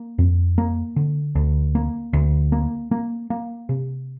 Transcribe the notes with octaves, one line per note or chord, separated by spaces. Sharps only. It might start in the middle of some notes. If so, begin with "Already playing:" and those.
Already playing: A#3
F2
A#3
D3
D2
A#3
D2
A#3
A#3
A#3
C3